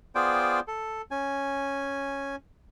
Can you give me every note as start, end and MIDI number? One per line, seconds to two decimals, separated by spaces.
0.15 0.60 59
0.15 0.60 65
0.15 0.60 68
0.15 0.60 72
0.15 0.60 74
0.15 0.60 79
0.68 1.02 69
1.11 2.36 61
1.11 2.36 80